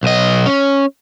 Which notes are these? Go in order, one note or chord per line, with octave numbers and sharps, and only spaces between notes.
B1 D#5
C#4